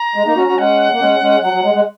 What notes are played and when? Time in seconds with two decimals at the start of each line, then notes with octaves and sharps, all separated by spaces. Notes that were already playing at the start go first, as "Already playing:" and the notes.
Already playing: A#5
0.15 G#3
0.26 A#3 D#4
0.37 C#4 F#4
0.47 C#4 F#4
0.58 G#3 C#4 F#5
0.92 A#3
1.00 G#3 C#4
1.21 G#3 C#4
1.42 F#3 F#5
1.53 F#3
1.64 G#3
1.74 G#3